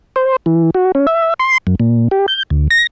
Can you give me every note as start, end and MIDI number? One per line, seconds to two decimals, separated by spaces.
0.16 0.36 72
0.46 0.70 52
0.75 0.92 66
0.95 1.06 61
1.07 1.34 76
1.39 1.58 84
1.67 1.75 42
1.80 2.08 46
2.11 2.26 67
2.28 2.43 91
2.50 2.68 38
2.71 2.87 94